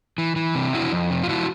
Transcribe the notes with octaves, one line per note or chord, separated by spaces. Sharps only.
E3
E3
C3
F2 E4 F#4
F2
C3
F4
F3 E4 F#4